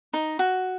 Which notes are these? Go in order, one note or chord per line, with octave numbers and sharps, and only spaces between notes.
D#4
F#4